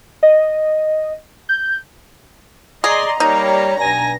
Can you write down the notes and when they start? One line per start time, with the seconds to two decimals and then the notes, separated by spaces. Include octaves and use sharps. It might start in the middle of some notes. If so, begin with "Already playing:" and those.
0.23 D#5
1.49 G6
2.84 G#4 D5 D#5 A#5 C6
3.20 G3 A#3 D#4 C#5
3.80 B1 G2 G#5 A#6